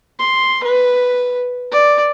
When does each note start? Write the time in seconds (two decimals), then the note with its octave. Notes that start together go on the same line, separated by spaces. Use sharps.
0.20 C6
0.64 B4
1.72 D5